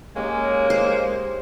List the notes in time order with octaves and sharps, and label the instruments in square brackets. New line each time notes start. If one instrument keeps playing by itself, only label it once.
[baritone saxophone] G#3 [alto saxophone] A#3 [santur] C#4 D#4 G4
[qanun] C5